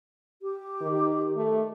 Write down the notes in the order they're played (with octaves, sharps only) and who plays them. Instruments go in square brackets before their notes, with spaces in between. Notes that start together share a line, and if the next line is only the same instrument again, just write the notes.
[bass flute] G4
[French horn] D#3
A3